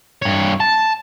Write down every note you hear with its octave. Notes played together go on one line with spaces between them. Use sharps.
G2 C#5
A5